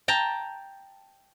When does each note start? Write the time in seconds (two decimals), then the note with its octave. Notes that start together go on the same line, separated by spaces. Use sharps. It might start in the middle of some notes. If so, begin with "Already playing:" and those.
0.08 G5 A5 A#5